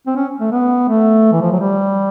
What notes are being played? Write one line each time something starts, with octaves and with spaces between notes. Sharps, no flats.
C4
C#4
A3
B3
A3
E3
F3
F#3
G3